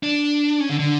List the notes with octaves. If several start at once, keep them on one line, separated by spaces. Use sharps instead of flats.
D4
C#4
D3
D3